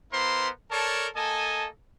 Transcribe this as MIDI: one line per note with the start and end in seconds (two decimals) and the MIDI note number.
0.12 0.49 59
0.12 0.49 64
0.12 0.49 70
0.12 0.49 72
0.12 0.49 84
0.71 1.08 69
0.71 1.08 70
0.71 1.08 73
0.71 1.08 74
0.71 1.08 81
1.15 1.68 58
1.15 1.68 69
1.15 1.68 75
1.15 1.68 80
1.15 1.68 81